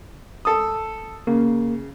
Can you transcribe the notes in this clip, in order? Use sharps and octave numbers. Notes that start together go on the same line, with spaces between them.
A4 D#6
C#3 A#3